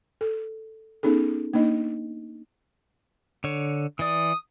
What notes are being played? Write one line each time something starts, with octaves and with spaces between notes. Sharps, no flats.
A4
B3 C#4 D#4 G#4 A4
A#3 D4 D#4 D#5
D3 C#5
E3 D5 D#6